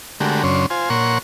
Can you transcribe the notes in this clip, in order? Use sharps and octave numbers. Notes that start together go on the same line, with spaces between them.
D3 G#3 A3 F#4 G4 A#4
F#2 C#3 C#4 D4 C6
F4 C5 G#5
A#2 A#4 C#5 F#5 C6 C#6